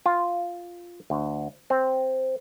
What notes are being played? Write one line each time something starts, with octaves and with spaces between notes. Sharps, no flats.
F4
D2
C4